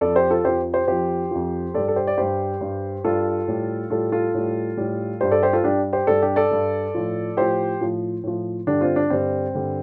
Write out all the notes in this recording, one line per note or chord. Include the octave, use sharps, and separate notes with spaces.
F2 F3 A4 D5
G4 C5
F4 A4
F2 F3 G4 C5
G4 C5
F2 F3 G4 C5
F2 F3
G2 G3 A4 D5
A4
G4 C5
D5
G2 G3 G4 C5
G2 G3
G2 G3 F4 A4
A2 G3
A2 G3 F4 A4
F4 A4
A2 G3
A2 G3
G2 G3 G4 C5
A4 D5
G4 C5
F4 A4
G2 G3 D4 G4
G4 C5
G2 G3 A4 D5
D4 G4
A4 D5
G2 G3
A2 F3
A2 F3 G4 C5
A2 F3
A2 F3
G2 D3 G3 D4
C4 F4
D4
G2 D3 G3 C4
G2 D3 G3